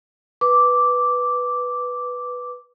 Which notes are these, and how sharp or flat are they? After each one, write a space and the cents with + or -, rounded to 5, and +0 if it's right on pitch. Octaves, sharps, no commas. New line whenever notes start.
B4 +0 D6 -5